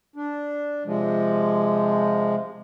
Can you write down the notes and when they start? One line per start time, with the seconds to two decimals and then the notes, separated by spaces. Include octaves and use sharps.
0.16 D4
0.86 C3 F3 G#3